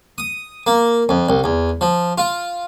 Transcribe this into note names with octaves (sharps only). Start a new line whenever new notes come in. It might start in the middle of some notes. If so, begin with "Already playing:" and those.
D#6
A#3
F2
C2
E2
F3
F4